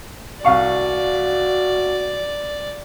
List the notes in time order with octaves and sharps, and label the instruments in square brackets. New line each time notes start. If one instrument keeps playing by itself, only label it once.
[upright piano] C2 F5 C#6 [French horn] F#4 [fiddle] D5